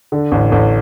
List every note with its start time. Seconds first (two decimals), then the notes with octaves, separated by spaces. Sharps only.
0.12 D3
0.32 A1
0.52 A1